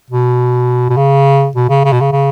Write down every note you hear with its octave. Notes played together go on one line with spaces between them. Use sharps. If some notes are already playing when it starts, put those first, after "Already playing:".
B2
B2
C#3
B2
C#3
C#3
B2
C#3
C#3